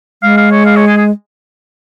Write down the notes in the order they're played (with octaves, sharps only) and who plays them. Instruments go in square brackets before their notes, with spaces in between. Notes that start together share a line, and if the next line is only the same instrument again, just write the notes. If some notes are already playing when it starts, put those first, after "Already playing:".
[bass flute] G#3 [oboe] F5
[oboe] F5
C#5
F5
C#5
G#4
G#4